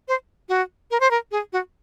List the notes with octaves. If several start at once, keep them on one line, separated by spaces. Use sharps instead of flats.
C5
F#4
A#4
C5
A#4
G#4
F#4